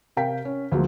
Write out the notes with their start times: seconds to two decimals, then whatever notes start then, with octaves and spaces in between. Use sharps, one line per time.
0.16 C3 A#4 F5 G5 B6
0.45 C#4
0.71 D2 F3 F#3 G#3 A#3